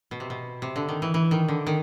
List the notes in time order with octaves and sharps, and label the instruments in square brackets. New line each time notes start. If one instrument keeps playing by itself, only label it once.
[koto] B2
C3
B2
C3
D3
D#3
E3
E3
D#3
D3
D#3